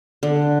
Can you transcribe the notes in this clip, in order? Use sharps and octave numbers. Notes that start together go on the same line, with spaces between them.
D3